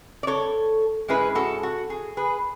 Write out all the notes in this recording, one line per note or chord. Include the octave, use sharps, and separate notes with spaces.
D5
A4 C#5
G#2 G#3 C#4 E4 G#4 B4
F#4 A4
F#4
G#4
G#4 B4